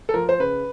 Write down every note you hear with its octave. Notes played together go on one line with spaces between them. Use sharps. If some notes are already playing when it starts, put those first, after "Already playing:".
A4
F3 A#4
C5
C#3 B4